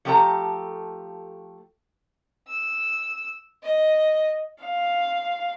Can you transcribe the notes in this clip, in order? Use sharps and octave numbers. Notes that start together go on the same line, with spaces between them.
F3 A3 G4 A4 A#4 A#5
E6
D#5
F5